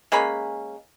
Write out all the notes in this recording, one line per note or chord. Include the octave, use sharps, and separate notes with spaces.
G#3 A#3 C#4 B5